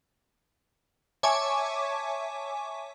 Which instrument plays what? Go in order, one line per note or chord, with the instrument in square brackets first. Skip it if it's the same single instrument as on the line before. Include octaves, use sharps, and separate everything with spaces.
[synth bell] C#5 E5 G#5 A5 C#6 D6